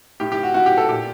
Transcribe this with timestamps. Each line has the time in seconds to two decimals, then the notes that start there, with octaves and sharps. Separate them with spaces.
0.20 A2 G4
0.32 G4
0.43 F#4
0.54 A2 F#4
0.66 G4
0.77 A4
0.89 A#2 G4